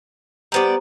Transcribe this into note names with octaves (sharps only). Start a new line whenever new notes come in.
G3 B3 G4 C5 D5 A#5